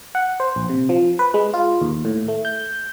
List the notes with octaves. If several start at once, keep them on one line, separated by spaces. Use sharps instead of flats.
F#5
C5
A#1
C3
F3
B4
G#3
F4
D#2
A2
A3
G6